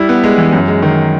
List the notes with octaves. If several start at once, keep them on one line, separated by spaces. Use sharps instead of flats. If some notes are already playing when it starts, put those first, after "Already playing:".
Already playing: G3 E4
B3
G#3
E3
F#2
G#3
D#3